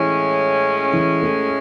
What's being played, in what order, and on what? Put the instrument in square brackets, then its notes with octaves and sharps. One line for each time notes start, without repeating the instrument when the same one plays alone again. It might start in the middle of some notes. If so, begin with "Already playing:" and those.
Already playing: [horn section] A2 G#3 C#4 [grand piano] E3
[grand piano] E3
A3